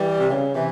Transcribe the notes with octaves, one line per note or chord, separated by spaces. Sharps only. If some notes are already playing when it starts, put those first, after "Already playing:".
Already playing: E3 G3
C3
C#3
C3 E3